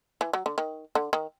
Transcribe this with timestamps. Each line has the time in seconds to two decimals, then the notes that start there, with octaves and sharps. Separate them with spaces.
0.21 E3
0.33 F#3
0.46 D3
0.58 D#3
0.95 D3
1.13 D#3